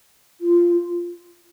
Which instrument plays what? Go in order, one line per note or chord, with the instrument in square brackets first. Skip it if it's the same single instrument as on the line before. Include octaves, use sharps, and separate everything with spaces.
[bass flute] F4